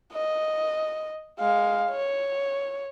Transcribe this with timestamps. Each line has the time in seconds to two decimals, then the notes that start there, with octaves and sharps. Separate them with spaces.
0.12 D#5
1.39 G#3 F5
1.90 C#5